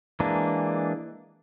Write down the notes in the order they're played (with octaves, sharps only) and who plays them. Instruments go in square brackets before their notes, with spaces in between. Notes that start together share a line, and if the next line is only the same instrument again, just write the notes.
[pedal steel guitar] E3 G#3 A#3 D4